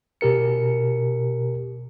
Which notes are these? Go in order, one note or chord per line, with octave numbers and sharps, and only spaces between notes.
B2 G4 A#4 C#7